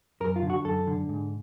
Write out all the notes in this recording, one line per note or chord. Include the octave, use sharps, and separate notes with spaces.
F#2 A#4
F4
D3
F#4
F#2 A4
D3
G#2